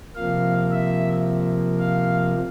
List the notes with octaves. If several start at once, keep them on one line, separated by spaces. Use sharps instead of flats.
C3 F3 A#3 F5
E5
F5